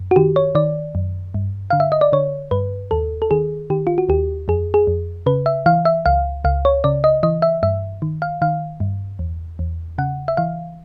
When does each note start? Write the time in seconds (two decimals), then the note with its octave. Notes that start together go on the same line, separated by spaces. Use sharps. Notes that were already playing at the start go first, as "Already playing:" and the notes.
Already playing: F#2
0.11 F#4
0.16 D#3 G4
0.36 C#5
0.55 D#3 D5
0.95 F#2
1.34 G2
1.70 D3 F5
1.80 E5
1.92 D#5
2.01 D5
2.12 D3 C#5
2.51 G2 B4
2.91 D#2 A4
3.22 A4
3.31 D#3 G#4
3.70 D#3 G4
3.87 F4
3.98 F#4
4.09 D#2 G4
4.48 F2 G#4
4.74 G#4
4.87 F2
5.26 C#3 B4
5.46 E5
5.66 E3 F5
5.85 E5
6.06 C#2 F5
6.44 C#2 F5
6.65 C#5
6.84 C#3 D5
7.04 D#5
7.23 E3 D#5
7.42 E5
7.63 G2 E5
8.02 D#3
8.22 F5
8.42 D#3 F5
8.80 G2
9.19 E2
9.59 E2
9.98 C#3 F#5
10.28 E5
10.37 E3 F5